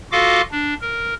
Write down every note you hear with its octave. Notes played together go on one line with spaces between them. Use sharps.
F4 F#4 A4 D#5 F5 D6
D4
A#4